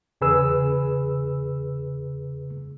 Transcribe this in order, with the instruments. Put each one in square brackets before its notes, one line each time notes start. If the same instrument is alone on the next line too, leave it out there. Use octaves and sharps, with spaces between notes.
[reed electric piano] E2 C#3 G#4 B4 E6